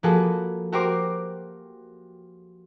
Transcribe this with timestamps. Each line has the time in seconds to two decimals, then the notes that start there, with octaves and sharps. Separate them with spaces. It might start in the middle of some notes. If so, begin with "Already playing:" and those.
0.03 F3 A#3 F#4 G#4 A4 B4
0.72 F#4 G4 A#4 C5 C6 D6